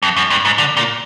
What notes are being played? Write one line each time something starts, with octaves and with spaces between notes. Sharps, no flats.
F2
F#2
G2
G#2
D3
A#2